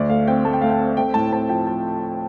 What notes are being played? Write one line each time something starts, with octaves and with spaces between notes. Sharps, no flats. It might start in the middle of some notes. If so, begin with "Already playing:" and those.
Already playing: D2 D5
A3 F5
C4 G5
A3 A5
G5
A3 F5
G5
C4
A3 G5
A2 A5
C4 A5
F3 G5
F3 A5